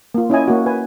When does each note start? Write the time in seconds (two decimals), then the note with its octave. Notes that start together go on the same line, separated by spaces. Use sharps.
0.14 A#3 F4
0.30 C#4 E4 D#5 G#5
0.48 A#3 F#4
0.66 B4 G#5